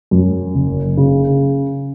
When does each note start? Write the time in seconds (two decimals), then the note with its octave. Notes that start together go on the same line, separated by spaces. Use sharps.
0.11 F#2
0.55 F#1
0.97 C#3